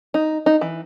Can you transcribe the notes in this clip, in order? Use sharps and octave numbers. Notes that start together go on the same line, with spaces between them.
D#4
D#4
E3